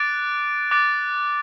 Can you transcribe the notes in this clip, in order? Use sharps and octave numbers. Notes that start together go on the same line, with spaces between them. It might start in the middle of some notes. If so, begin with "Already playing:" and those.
Already playing: D6 F#6 A6 D7
D6 F#6 A6 D7